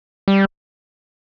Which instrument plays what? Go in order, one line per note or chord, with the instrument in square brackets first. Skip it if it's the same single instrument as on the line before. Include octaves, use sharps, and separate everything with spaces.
[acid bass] G3